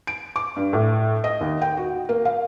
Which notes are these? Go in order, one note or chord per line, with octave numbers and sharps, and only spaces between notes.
D7
D6
G2
A2
D#5
D#2
G5
F#4
A#3
F5